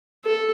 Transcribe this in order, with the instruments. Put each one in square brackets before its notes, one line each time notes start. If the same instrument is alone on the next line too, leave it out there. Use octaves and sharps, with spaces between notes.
[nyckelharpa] A4